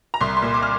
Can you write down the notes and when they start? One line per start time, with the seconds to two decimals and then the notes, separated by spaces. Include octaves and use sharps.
0.14 A#5
0.21 C2 C6
0.37 C6
0.42 A#2
0.54 D6
0.63 F6